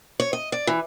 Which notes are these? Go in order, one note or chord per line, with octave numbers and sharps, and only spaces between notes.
C#5
D#5
D5
E3